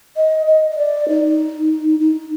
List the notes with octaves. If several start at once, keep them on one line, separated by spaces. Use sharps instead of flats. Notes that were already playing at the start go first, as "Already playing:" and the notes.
D#5
D#5
D#5
D5
D#4
D#4